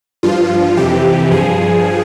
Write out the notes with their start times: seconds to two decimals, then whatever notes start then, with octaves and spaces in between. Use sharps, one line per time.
0.23 G2 F3 F4
0.77 F2 C3 E3 G4
1.31 G2 F3 G#4